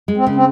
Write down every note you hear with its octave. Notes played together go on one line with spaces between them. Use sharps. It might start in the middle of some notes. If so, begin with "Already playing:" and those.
G#3
C4
C#3
C4